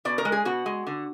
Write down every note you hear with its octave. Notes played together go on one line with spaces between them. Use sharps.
B2 D5
A#4
G#3
G#4
B2 F#4
G#3
D3